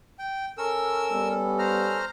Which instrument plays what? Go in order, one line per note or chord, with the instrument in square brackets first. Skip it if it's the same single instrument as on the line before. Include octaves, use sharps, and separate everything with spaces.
[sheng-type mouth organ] G5
[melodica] C#4 A4 [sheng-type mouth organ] A#4 E6
[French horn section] G3 B3
[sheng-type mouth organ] C5 A#5 F6